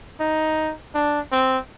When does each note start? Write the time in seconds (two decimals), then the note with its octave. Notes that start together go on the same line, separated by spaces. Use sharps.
0.20 D#4
0.94 D4
1.32 C4